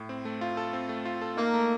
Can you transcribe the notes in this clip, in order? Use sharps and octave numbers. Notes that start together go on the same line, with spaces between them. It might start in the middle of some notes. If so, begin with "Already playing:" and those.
Already playing: A2
C4
A3
F4
A4
C4
A3
F4
A4
A#3 D#4
A3